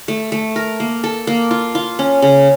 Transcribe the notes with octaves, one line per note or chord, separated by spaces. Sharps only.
A3
A3
A#4
A#3
A4
A#3
F4
F4
C#4
C#3